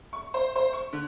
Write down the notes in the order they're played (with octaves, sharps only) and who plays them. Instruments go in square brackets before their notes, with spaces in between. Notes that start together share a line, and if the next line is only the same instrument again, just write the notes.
[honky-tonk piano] C#6
C5
C5
C#6
D3